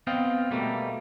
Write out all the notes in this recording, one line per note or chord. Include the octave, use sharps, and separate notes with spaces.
B3 C4 D#5 F5 G5
B2 G3 A3 A#3